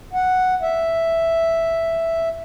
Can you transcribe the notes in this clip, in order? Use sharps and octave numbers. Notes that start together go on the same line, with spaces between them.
F#5
E5